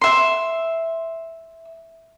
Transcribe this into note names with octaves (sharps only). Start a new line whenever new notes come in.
E5 C6